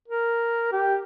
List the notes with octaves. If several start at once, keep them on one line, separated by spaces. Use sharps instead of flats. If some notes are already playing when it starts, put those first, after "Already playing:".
A#4
G4